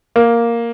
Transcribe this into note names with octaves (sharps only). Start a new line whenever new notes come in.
A#3